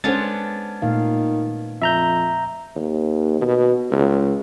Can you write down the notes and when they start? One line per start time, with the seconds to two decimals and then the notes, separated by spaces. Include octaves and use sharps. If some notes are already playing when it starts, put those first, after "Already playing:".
0.04 G#3 B3 C#4 D4 A4 C5 A6
0.82 A#2 D#3 A3 F5
1.82 F2 E5 A#5 G6
2.76 D#2
3.41 B2
3.91 C#2